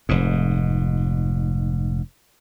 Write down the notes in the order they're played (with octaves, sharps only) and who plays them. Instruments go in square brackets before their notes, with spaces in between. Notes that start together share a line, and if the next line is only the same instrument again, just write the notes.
[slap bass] F1 G#2